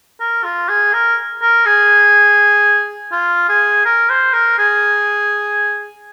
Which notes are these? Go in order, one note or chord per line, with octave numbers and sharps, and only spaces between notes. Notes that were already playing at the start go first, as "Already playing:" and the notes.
A#4
F4
G#4
A#4
A#4
G#4
F4
G#4
A#4
C5
A#4
G#4